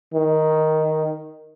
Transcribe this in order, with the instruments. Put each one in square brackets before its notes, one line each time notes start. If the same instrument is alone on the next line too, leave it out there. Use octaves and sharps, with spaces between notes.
[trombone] D#3